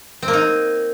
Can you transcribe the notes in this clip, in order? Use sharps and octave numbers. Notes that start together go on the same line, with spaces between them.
C4
A#3
D#4